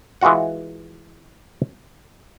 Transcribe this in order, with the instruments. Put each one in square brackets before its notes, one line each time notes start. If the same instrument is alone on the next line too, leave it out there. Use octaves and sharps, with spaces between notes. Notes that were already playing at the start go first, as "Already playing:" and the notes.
[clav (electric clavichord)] E3 G#3 F4 F#4 F#5